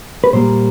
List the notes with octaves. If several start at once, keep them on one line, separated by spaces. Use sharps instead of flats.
B4
A#2 G3 A#3 C5